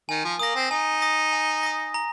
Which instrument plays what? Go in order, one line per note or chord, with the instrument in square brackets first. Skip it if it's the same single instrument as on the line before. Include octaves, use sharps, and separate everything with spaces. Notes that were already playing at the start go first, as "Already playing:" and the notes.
[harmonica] D#3 [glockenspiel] G#5
[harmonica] F3
[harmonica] A#3 [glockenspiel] D#6 A#6
[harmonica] C4
[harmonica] D#4 [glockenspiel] G#5
[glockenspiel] D#6 A#6
G#5
D#6 A#6
A#5